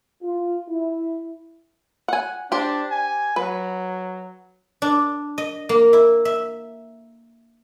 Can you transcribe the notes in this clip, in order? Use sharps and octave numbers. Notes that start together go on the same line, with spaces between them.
F4
E4
F#5 G#5
D4 G4 C5
G#5
F#3 B4
D4
D#5
A#3
E4
E5